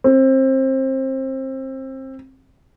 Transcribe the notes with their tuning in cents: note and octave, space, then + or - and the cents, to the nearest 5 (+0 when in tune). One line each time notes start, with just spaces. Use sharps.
C4 +25